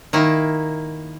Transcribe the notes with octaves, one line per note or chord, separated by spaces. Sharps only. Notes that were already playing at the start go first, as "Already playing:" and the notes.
D#3 A#3 E4